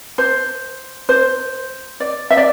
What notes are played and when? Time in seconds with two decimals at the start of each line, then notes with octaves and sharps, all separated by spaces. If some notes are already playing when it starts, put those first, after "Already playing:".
0.18 C5
1.09 C5
2.00 D5
2.31 E5
2.37 D5